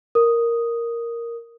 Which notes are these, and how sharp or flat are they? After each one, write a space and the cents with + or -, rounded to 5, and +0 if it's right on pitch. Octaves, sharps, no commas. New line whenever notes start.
A#4 +0 D#6 +0